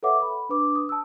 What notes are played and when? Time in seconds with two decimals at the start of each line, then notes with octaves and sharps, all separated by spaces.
0.03 A4 B4 C#5 E5 F#5 D6
0.22 B5
0.49 D4 B4 D6
0.76 D#6
0.89 A5 E6